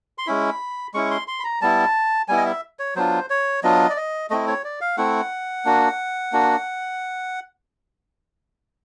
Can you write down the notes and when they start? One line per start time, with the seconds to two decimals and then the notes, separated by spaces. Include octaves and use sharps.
0.18 C6
0.27 G#3 C#4 E4 B5
0.94 G#3 C#4 E4 C#6
1.11 C6
1.28 C6
1.40 B5
1.44 A#5
1.62 G3 B3 E4 A5
2.28 G3 B3 E4 G#5
2.37 D#5
2.46 E5
2.79 C#5
2.96 F#3 B3 D4 F4 C5
3.30 C#5
3.63 F#3 B3 D4 F4 D#5
3.90 D5
3.97 D#5
4.30 A3 C4 E4 D#5
4.47 C#5
4.64 D5
4.81 F5
4.97 A3 C4 E4 F#5
5.65 A#3 D4 F#4
6.32 A#3 D4 F#4